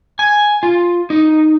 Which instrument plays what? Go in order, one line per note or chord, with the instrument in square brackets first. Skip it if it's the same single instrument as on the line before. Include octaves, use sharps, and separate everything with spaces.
[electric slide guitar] G#5
F4
D#4